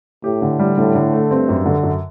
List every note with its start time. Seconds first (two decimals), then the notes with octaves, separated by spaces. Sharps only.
0.24 A2 G4
0.42 D3
0.59 G3
0.77 A2 D3
0.95 D3
1.13 A3
1.30 G2 C4
1.49 F#2
1.66 D3
1.83 F#2